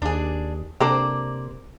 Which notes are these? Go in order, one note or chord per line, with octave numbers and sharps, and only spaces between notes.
D#2 D4 G#4
C3 A#3 D4 A4 C5 D5 G5